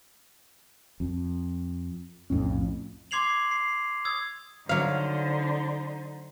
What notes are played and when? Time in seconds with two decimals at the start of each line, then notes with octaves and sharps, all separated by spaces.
1.00 F2
2.30 B1 F2 A2 C#4
3.11 C6 D6 G#6 C7 F7 F#7
3.51 C7
4.05 D#6 E6 G#6
4.69 D3 F#3 D#4 C5 F5